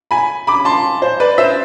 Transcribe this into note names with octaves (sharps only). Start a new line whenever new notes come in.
G#5 B5
B5 D6
A5 C6
C5
B4 D5
C5 E5